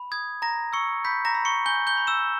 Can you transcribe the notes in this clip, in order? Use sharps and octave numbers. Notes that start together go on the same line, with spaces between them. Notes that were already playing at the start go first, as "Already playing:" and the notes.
Already playing: B5
D#6 G#6
A#5 A#6
C#6 E6 C#7
B5 G6 B6
A#5 A#6
B5
C#6 C#7
G#5 G6 G7
G6 G7
B5
E6 E7